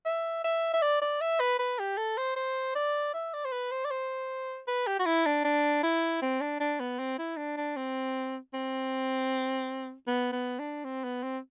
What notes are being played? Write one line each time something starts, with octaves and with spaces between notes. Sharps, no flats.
E5
E5
E5
D5
D5
E5
B4
B4
G4
A4
C5
C5
D5
E5
D5
C5
B4
C5
D5
C5
B4
G4
F#4
E4
D4
D4
E4
C4
D4
D4
B3
C4
E4
D4
D4
C4
C4
B3
B3
D4
C4
B3
C4